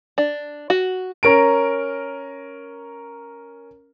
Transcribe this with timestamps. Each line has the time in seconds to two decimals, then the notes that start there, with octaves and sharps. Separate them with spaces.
0.18 D4
0.70 F#4
1.23 C#4 A#4 A#5 D7